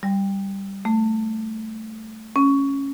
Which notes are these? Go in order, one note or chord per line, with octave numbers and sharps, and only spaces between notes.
G3
A3
C#4